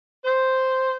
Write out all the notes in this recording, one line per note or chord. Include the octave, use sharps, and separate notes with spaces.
C5